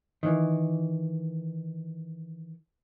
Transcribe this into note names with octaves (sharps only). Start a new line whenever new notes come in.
D#3 E3